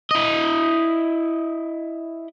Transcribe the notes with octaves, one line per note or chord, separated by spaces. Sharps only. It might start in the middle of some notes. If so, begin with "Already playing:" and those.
E4 D#5